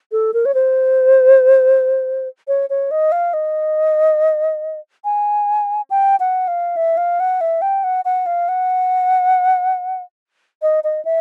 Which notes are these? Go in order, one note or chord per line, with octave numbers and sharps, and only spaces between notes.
A4
A#4
C#5
C5
C#5
C#5
D#5
F5
D#5
G#5
G5
F#5
F5
E5
F5
F#5
E5
G5
F#5
F#5
F5
F#5
D#5
D#5
E5